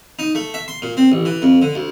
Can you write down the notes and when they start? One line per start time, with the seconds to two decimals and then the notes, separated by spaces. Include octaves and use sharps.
0.19 D#4
0.35 A3
0.54 E5
0.68 C6
0.82 A#2
0.97 C4
1.12 A1
1.25 E3
1.42 F2
1.62 D3
1.75 D2